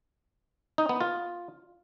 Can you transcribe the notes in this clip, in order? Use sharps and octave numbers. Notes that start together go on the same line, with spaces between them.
D#4
B3
F4